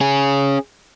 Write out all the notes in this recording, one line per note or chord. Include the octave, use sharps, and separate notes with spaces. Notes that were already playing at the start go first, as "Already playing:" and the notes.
C#4 G#4